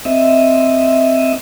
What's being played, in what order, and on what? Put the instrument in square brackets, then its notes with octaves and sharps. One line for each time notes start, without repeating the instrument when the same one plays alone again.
[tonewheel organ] C4 D#5 E5